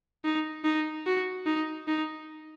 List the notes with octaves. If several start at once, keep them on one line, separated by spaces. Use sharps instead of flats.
D#4
D#4
F#4
D#4
D#4